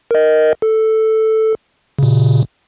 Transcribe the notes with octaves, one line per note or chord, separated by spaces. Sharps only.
A#4 D#5
A4
A#2 C#3